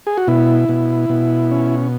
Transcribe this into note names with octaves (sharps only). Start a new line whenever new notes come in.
G#4
F#4
B2 E4
B2
B2
C#4